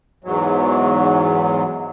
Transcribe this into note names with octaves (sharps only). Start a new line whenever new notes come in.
E2 G#2 F#3